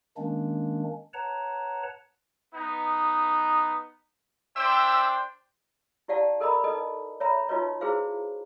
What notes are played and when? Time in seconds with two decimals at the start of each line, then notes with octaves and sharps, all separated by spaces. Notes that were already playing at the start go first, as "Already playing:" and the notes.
0.17 D#3 G#3 A#3 C#4 D4
1.14 B4 C#5 F#5 A5 A#5
2.53 B3 D#4
4.56 D4 C5 E5 G5 E6
6.08 E4 G4 D5 F5 F#5 A5
6.40 A4 A#4 D#5 A#5 B5
6.64 D#4 A4 B4 D#5
7.20 C#5 E5 A#5 B5
7.48 D#4 F4 F#4 B4 C#5 D#5
7.81 E4 F#4 G#4 B4 C5 F5